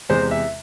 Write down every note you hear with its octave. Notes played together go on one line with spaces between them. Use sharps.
E2 C3 G#3 C5
E5